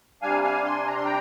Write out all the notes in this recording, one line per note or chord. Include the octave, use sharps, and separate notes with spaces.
C3 G3 D4 F5 G#5
F5 G#5
G#5 C6
A#5
C6
G5 A#5